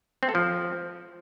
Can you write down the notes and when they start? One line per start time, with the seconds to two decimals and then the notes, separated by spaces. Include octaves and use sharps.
0.23 C4
0.29 A4
0.35 F3